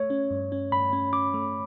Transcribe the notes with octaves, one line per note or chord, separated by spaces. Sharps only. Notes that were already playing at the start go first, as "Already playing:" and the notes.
Already playing: A3 C#5
C#4
G2
C#4
G2 B5
C#4
C#4 D6
A3